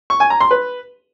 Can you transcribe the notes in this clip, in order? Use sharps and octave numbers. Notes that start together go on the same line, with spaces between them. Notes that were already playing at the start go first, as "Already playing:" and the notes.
C#6
G#5
A#5
C6
B4